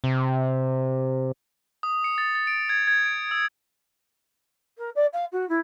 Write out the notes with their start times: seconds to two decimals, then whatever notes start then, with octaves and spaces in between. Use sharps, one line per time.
0.04 C3
1.83 D#6
2.04 C#7
2.18 A6
2.35 A6
2.47 D7
2.69 G#6
2.87 G#6
3.06 D7
3.31 E6
4.77 A#4
4.95 D5
5.12 F5
5.32 F#4
5.49 E4